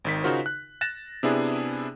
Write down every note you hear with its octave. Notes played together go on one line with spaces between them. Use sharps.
G#1 D#3 B6
C#3 D#4 F4 F#4 A#4 C5
F#6
F#6 A6 A#6 E7
C3 B3 D4 E4 G#4